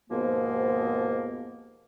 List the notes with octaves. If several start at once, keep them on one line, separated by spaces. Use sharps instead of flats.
D#2 G#2 B2 F3 A#3 B3